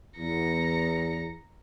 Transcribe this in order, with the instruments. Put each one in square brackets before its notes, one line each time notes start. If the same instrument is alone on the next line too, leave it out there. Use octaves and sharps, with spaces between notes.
[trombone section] E2 [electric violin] A#5 C#7